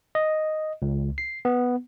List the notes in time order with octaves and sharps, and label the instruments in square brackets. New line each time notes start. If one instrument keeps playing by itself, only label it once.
[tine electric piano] D#5
C#2
C7
B3